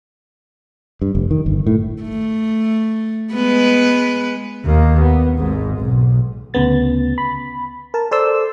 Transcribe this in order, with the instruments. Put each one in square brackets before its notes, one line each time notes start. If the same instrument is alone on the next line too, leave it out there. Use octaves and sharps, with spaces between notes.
[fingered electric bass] G2
F1
D#3
G1
A2
[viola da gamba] A3
G#3 B3 B4
[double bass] D#2 A#3
B3
G#1 G#2
B1
[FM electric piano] D2 C#3 B3 A6
B5
A#4 A5
A4 C5 D5 A5 C6 E6